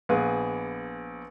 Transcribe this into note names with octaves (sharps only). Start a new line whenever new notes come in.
A#1 B3 G#4 B4